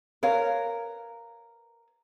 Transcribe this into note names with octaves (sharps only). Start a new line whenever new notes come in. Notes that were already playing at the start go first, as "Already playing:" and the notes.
A#4 B4 C#5 F5